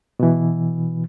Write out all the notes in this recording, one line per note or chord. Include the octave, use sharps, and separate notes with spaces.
B2 E3